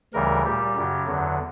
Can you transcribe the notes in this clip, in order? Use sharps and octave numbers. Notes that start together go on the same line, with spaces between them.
D2 C#3 E3 G3 A#4
A#2 G3 G4
F#2 C#3 F#3
E2 D3 F#3